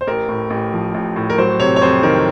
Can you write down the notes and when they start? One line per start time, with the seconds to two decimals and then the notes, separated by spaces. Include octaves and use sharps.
0.01 C5
0.07 A1 A#4
0.29 A2
0.50 A1
0.73 F3
0.94 A1
1.16 A2
1.30 A#4
1.38 F#3 C5
1.59 C3 C#5
1.76 C#5
1.82 F2 C5
2.03 D#3 A#4